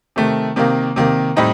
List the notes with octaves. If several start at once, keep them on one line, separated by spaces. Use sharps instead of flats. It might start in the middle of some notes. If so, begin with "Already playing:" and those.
C3 D#3 A3
C3 D#3 A#3
C3 D#3 A#3
A2 G3 C4 D#4